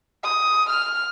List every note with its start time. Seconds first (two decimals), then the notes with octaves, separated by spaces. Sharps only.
0.24 D#6
0.70 F6